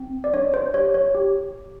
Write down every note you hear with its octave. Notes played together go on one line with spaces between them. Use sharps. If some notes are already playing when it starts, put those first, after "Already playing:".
Already playing: C4
D5
D4 C#5
C5
G4 C#5
C#5
G4